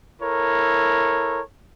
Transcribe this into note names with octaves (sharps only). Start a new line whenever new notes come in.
E4 A4 A#4 C#5